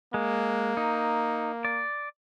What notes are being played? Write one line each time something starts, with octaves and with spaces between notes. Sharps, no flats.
G#3 A#3
D#4
D5